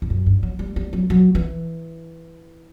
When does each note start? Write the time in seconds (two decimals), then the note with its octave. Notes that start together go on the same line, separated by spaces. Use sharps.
0.02 E2
0.10 F#2
0.26 G2
0.43 F#3
0.59 G3
0.76 G3
0.93 F#3
1.10 F#3
1.35 E3